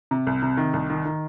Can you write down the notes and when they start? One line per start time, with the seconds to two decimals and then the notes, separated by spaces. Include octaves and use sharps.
0.11 C3
0.27 C2
0.43 C3
0.57 D#3
0.73 C2
0.90 D#3
1.05 D#3